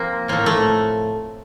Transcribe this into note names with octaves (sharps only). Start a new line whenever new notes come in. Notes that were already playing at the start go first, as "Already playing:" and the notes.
Already playing: F3 A#3 C4
A2 F3 A3 A#3
A3